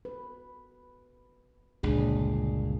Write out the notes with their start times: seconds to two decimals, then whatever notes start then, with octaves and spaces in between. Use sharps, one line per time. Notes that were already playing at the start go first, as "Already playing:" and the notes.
0.05 B4
1.83 G1 C#2 A#2 D4 G#4